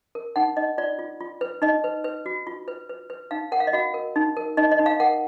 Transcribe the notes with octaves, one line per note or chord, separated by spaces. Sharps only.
A#4
D#4 F#5
D#4 D#5
F4 D5
F4
F4
B4
D#4 D#5
B4
B4
F#4
F4
B4
B4
B4
D#4 F5
A#4 F#5
F5
D#5
F#4 F5
A#4
D#4
A#4
D#4 D#5
D#5
D#4
F5
A#4 F#5